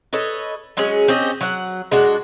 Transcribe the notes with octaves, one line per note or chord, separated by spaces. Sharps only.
A4 B4 C#5 D#5
F#3 G#3 C#4 G#4
C4 C#4 G4 D#5
F#3 F#5
G#3 D4 F#4